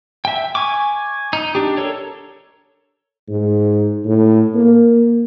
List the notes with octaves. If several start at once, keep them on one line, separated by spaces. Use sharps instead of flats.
E5 G5
G#5 C#6 D6
D#4
D4 G4
A4 A#4 C#5
G#2
A2
A#3